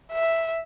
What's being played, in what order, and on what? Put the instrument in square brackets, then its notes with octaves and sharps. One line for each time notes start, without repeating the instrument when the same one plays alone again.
[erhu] E5